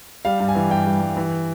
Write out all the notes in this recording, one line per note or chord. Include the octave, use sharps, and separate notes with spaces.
G3 F5
G2
G#5
E3
G2 G5
G3
G2
E3